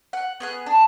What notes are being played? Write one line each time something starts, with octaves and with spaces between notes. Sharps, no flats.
F#5
B3 G#4 F#6
D4